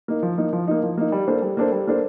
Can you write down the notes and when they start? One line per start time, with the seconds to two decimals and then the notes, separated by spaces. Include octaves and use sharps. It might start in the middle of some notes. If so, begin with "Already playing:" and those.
0.08 A#3 D#4
0.23 F3
0.38 A#3 D#4
0.53 F3
0.68 A#3 D#4
0.83 F3
0.98 A#3 D#4
1.12 G3
1.27 A#3 D4 A4 C5
1.42 G3
1.57 A#3 D4 A4 C5
1.72 G3
1.87 A#3 D4 A4 C5